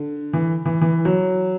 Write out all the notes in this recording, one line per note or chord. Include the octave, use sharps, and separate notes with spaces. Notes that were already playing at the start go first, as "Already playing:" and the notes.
Already playing: D3
E3
E3
E3
F#3